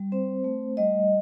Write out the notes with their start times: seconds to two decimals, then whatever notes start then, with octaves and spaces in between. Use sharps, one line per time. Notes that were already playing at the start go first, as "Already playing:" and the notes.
Already playing: G3
0.12 C4 C5
0.44 A3
0.77 G3 D#5